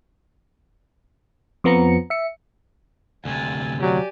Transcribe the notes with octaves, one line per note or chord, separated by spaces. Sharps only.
F2 F3 B3 A#5 C#7
E5 C#7
D2 C3 G#5 A6
F#3 G4 D5 G#5